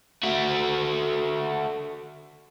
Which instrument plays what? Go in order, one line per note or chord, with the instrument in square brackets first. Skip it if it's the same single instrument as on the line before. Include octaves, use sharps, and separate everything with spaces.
[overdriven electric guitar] A3 F#4